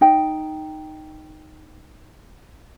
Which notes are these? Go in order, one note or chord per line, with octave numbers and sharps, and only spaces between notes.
D#4 G5